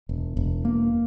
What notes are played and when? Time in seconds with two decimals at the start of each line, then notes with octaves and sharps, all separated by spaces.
0.09 E1
0.37 E1
0.65 A#3